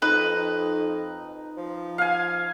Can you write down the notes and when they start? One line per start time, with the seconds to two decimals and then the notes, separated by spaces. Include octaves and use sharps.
0.02 F2 D#4 B4
1.57 F3
1.98 F5 G#5